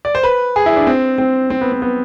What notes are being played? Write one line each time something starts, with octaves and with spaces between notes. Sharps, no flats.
D5
C5
B4
G#4
E4
D4
C4
C4
C4
B3
C4
B3